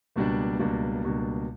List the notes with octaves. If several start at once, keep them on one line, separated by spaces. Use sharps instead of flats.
C#2 B2 G3 A#3 D4
C#2 B2 G3 A#3 D4
C#2 B2 G3 A#3 D4